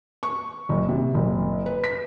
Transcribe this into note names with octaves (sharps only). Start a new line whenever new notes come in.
C#6
F#1
C3
F#1
B4
B6